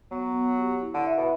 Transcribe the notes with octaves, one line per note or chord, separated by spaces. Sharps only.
F#3 B3
B3
G4
E4
D3
E5
B2